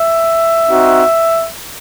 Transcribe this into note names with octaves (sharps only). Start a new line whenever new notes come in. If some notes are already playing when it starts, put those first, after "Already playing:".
Already playing: E5
C4 D#4 F#4